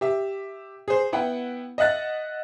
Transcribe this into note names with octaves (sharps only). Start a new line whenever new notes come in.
G4 E5
G#4 C5
B3 E4 F#5 G5
D#5 E5 F#5 F#6 A6